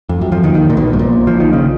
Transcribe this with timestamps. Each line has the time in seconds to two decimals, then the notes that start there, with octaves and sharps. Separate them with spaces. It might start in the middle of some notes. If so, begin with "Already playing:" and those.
0.09 F2
0.21 F#2
0.32 F2 F3
0.43 D#2 D#3
0.54 D#2 D#3
0.70 A#2
0.77 B1 B2
0.93 G#2
0.99 A#1 A#2
1.27 F3
1.40 D#3
1.53 C#3